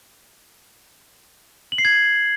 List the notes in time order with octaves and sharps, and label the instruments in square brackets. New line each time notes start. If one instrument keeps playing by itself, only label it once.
[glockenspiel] F#7
C7
G#6